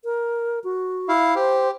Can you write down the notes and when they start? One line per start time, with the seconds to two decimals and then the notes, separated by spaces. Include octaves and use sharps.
0.04 A#4
0.64 F#4
1.08 E4 F5
1.36 G4 C5